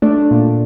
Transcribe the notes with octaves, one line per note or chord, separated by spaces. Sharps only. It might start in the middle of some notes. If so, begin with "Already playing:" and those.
A3 D4
A#2